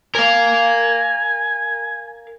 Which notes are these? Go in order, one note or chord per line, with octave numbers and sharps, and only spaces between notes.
A#4 F5 G#5